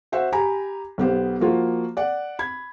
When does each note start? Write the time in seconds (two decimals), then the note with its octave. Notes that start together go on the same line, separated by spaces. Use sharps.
0.12 F#4 C5 E5 F#5
0.32 G4 G#5 A#5 B5
0.98 B1 B3 G4 C5
1.40 F3 A#3 F4 F#4
1.97 D5 F#5
2.39 B5 G#6